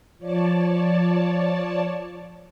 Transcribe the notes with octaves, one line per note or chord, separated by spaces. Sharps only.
F3 C#5 D5 A5